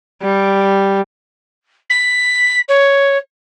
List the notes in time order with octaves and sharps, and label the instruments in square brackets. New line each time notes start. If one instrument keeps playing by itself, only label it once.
[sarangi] G3
[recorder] B6
C#5